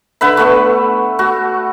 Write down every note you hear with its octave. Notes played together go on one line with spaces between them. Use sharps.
D3 B4 E5 B5
A3 B3 C#6
A3 F#4